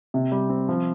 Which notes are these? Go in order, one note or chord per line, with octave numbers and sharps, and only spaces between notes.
C3
G3
C4
F3